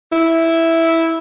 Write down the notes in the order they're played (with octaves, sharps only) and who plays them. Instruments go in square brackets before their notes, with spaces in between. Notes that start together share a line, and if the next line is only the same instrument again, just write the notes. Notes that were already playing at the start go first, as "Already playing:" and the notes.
[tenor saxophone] E4